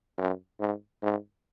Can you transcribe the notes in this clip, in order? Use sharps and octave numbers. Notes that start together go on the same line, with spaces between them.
F#2
G#2
G#2